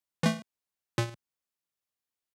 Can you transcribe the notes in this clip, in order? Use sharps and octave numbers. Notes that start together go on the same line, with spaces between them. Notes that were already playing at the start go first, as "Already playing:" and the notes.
E3 A3
A#2